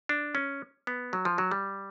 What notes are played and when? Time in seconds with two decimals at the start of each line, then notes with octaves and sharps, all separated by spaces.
0.09 D4
0.35 C#4
0.87 B3
1.13 F#3
1.25 F3
1.38 F#3
1.51 G3